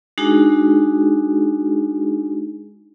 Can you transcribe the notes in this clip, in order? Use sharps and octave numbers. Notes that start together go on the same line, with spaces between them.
G#3 D4 D#4 F#4 G#4